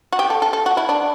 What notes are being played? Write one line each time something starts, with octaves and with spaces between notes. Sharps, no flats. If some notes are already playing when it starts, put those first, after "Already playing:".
F#4
G4
A4
A4
A4
F#4
E4
D4